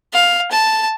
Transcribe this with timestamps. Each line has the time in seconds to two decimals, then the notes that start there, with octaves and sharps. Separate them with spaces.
0.13 F5
0.51 A5